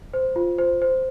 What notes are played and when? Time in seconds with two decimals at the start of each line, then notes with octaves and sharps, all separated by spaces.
0.14 C5
0.36 F4
0.58 C5
0.82 C5